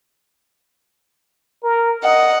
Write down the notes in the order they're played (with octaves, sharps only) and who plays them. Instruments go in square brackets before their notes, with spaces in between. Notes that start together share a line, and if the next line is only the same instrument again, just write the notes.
[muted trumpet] A#4
[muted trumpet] D#5 [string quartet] F#5